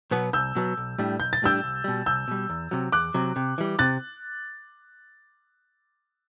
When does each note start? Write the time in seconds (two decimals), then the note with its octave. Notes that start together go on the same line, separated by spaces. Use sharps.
0.11 B2 F#3 B3
0.33 C2 E6 G6
0.55 B2 F#3 B3
0.77 B1
0.99 A2 G3 D4
1.20 B1 G6
1.33 A6
1.42 A2 G3 D4 E6 G6
1.64 C2
1.84 B2 G3
2.06 C2 E6 G6
2.28 B2 G3
2.49 E2
2.71 C3 F#3
2.92 E2 D6 F#6
3.14 C3 F#3
3.36 C3
3.58 E3 G3
3.79 C3 F#6 A6